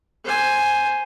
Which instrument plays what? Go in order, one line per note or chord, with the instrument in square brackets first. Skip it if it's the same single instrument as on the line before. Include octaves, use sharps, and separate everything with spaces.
[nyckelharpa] C5 G#5